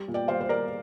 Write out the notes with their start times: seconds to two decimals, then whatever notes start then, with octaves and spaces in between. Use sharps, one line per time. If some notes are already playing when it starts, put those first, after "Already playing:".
Already playing: G3
0.08 A#2
0.14 D5 G5
0.28 G3 C5 F5
0.41 C5
0.49 G3 A#4 D5